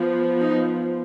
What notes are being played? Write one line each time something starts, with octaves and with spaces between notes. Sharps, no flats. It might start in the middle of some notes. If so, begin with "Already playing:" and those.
Already playing: F3 B3
D#4